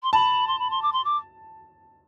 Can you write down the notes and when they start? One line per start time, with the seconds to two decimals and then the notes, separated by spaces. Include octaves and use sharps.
0.03 C6
0.13 A5 B5
0.47 C6
0.59 B5
0.70 C6
0.82 D6
0.92 C6
1.04 D6